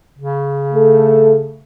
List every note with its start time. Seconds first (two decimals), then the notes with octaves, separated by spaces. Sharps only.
0.18 C#3
0.73 A3 A4